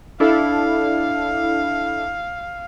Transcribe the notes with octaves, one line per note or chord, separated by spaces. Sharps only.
D4 E4 A4 F5